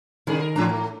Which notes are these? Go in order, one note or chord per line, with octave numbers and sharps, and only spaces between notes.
C3 D#3 G3 G#4
A#4
A2 E3 C#4 D4 A#5
A3